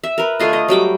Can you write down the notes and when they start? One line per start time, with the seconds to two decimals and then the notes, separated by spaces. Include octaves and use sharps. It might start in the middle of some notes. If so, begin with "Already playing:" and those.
0.04 E5
0.18 A#4 B4
0.39 D3 A3 F4 D#5
0.53 D#5
0.68 F#3 G3 G5 D6